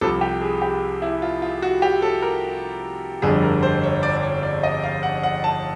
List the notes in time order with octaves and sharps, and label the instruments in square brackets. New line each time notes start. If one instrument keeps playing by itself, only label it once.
[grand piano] C2 C3 F3 A4
G4
G#4
G4
E4
F4
F4
F#4
G4
A4
A#4
G1 F2 D3 G3 G#4
A#4
C5
C#5
D5
D5
C#5
D5
D#5
F5
F#5
F#5
A5